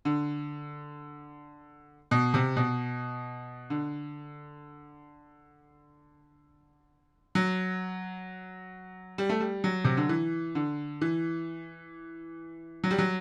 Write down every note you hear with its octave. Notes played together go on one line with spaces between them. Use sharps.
D3
B2
C3
B2
D3
F#3
G3
A3
G3
F#3
C3
D3
E3
D3
E3
F#3
G3
F#3